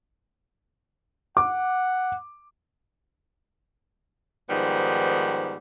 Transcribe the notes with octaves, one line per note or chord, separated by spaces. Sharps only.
F#5 D6
G#2 D#3 F3 G3 B3